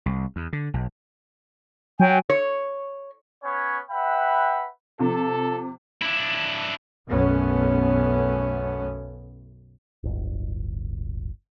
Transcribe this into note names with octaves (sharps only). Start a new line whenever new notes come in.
C2
E2
D3
B1
F#3 G5 G#5
C#5
B3 C#4 C#5
B4 E5 F#5 G5 B5
C3 F3 A4
D4 E4
B1 F#2 A3 B3 C#4
D1 G1